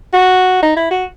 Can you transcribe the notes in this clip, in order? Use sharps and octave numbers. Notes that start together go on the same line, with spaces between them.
F#4
D#4
E4
F#4